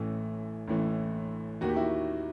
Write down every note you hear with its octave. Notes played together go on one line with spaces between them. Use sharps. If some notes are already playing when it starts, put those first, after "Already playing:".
Already playing: A1 A2 E3
A1 A2 E3
D#2 D#3 F#4
G4
E4 F#4